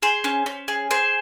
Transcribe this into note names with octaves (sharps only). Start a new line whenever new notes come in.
G#4 C5
C#4
C#4
G#4
G#4 C5